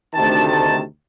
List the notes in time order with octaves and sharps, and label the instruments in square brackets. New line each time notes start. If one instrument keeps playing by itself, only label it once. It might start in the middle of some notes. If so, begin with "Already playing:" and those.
[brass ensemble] D2 C3 D#3 A5
A5